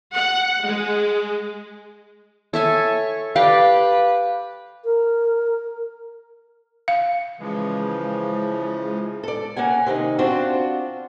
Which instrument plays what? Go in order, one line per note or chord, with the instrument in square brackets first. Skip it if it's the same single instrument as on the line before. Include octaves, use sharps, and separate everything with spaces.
[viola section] F#5
G#3
[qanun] A4 E5 G#5 [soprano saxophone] C#5
[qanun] G4 D5 G5 [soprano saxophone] B4 [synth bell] F5
[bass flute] A#4
[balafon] F5
[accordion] C#3 E3 F3 [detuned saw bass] G#3
[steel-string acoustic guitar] A4 D5
A#3 C#4 F#5 G#5
C3 D#3 D#4
C4 D4 F4 F#4